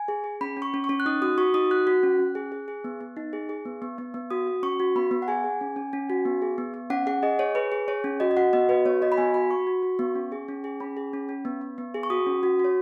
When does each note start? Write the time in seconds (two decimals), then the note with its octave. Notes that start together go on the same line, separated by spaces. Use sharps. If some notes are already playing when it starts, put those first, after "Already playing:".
Already playing: G#5
0.08 G#4
0.24 G#4
0.41 C#4 B5
0.57 C#4
0.62 C#6
0.74 C#4
0.84 C#6
0.89 C#4
1.00 F#6
1.06 D#4 D#6
1.22 F#4 D#6
1.38 F#4 C#6
1.54 D#4 D#6
1.70 F#4 F#6
1.87 F#4
2.03 C#4
2.19 C#4
2.35 G#4
2.52 G#4
2.68 G#4
2.84 B3
3.01 B3
3.17 D#4
3.33 G#4
3.49 G#4
3.65 B3
3.82 B3
3.98 B3
4.14 B3
4.30 F#4 D#6
4.47 F#4
4.63 C#4 C#6
4.80 F#4
4.95 B3 B5
5.11 B3
5.22 F#5
5.28 G#4 G#5
5.44 G#4
5.61 C#4
5.76 C#4
5.93 C#4
6.10 F#4
6.25 B3
6.42 G#4
6.58 B3
6.74 B3
6.90 C#4 F#5
7.07 G#4 F#5
7.23 G#4 D#5
7.39 G#4 C#5
7.55 G#4 B4
7.72 G#4
7.88 G#4 C#5
8.04 C#4
8.20 F#4 D#5
8.31 D#5
8.37 F#4 F#5
8.53 B3 D#5
8.69 F#4 B4
8.85 B3 C#5
9.02 F#4 D#5
9.12 B5
9.18 B3 G#5
9.34 F#4 B5
9.51 F#4 C#6
9.67 F#4
9.83 F#4
9.99 B3
10.15 C#4
10.32 G#4
10.48 C#4
10.64 G#4
10.80 C#4 B5
10.97 G#4
11.13 C#4
11.29 C#4
11.45 B3
11.61 B3
11.78 B3
11.94 G#4
12.03 C#6
12.10 F#4 D#6
12.27 C#4
12.43 F#4
12.59 F#4
12.64 C#5